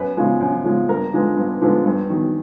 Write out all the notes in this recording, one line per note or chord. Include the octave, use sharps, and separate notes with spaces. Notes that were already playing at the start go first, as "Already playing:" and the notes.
Already playing: F#2 B4
C#3 F3 G#3
F#2
C#3 F3 G#3
G2 A#4
D3 F3 G#3 B3
G2
D3 F3 G#3 B3
G2
D#3 F#3